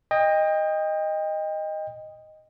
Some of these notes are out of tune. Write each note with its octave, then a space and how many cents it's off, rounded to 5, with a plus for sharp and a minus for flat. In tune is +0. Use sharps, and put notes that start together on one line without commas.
D#5 +0 G5 +30